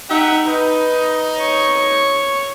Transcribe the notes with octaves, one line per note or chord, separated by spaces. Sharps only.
D#4 G4 E5 F#5
D#4 B4
C#5 C#6